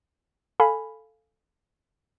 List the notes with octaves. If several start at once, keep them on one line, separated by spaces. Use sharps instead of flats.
A4 F5 G#5 B5